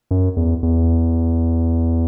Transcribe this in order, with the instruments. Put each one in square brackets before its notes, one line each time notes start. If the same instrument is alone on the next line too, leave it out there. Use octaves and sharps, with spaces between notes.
[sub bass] F#2
E2
E2